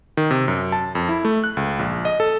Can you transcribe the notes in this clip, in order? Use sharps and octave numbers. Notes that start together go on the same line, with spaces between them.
D#3
C3
F#2
A5
F2
E4
A3
F#6
C#2
A#1
D#5
A4